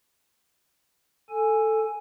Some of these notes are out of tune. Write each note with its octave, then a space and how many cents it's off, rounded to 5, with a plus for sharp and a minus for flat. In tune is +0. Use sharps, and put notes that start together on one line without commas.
A4 +5 G#5 +0